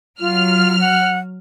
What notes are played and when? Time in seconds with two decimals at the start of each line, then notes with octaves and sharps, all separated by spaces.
0.20 F#3 F4 F6
0.80 F#5